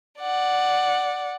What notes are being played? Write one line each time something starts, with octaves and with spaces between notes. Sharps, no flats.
D5 F#5